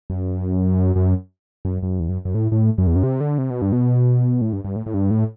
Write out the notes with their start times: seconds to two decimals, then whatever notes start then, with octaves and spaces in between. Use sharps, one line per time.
0.10 F#2
0.96 F#2
1.65 F#2
1.83 F#2
2.00 E2
2.09 F#2
2.25 F#2
2.35 A2
2.52 A2
2.78 F#2
2.87 E2
2.96 F#2
3.03 C3
3.21 D3
3.38 C3
3.50 B2
3.62 G2
3.72 B2
4.41 A2
4.53 G2
4.65 G2
4.76 A2
4.86 A2
4.94 G2
5.11 A2